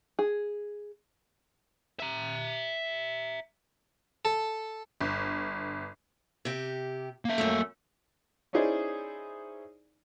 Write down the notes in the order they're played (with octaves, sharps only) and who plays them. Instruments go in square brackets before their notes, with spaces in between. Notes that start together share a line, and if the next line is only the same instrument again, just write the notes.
[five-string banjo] G#4
[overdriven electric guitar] E5 A#5
[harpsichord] A4
[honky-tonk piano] G1
[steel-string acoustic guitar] C3 G4
[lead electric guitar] A#3 E5
[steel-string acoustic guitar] F#2 A3
[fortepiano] C#4 D#4 E4 G#4 C5 D5